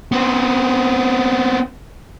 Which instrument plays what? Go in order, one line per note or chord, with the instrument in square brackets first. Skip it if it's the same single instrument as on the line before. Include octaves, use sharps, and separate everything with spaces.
[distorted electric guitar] B3 C4